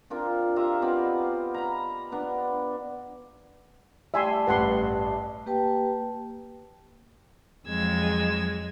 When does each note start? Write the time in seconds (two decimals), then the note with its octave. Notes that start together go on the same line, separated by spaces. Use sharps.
0.10 C4 D4 F4 A#4
0.56 F4 G4 E5 A#5
0.82 B3 C4 D5 D#5
1.54 A#5 B5
2.12 B3 D4
4.14 G3 A3 E5 G#5 C6
4.47 A1 G2 B4 F#5 C6
5.46 A#3 G4 B4 G5 A5
7.68 F2 F#3 G#3 E6 G#6